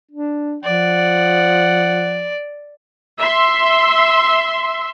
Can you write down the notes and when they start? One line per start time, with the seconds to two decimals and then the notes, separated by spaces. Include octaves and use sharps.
0.11 D4
0.64 F3 D5 F#5
3.18 E5 C6